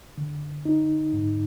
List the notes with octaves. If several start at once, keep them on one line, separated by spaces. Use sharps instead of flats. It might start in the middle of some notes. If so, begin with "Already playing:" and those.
D3
D#4
G#2